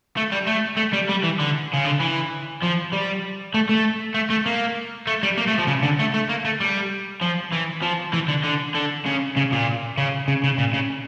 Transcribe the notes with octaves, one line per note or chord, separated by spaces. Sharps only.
A3
G3
A3
A3
G3
G3
E3
D3
C#3
D3
E3
F3
G3
A3
A3
A3
A3
A#3
A3
G3
A#3
A3
F3
C#3
D3
A3
A3
A#3
A3
G3
F3
E3
F3
E3
D3
D3
D3
C#3
C#3
A#2
C#3
C#3
C#3
A#2
C#3